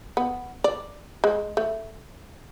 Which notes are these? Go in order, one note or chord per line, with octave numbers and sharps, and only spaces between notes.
B3
D5
G#3
A3